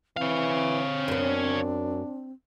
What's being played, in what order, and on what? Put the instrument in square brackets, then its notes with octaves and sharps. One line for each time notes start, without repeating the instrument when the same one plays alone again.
[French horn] E3 [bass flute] C4 [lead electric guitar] C#5 F5
[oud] F#2 B3 [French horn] D4